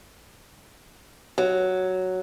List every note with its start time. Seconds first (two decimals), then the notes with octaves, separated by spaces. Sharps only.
1.38 F#3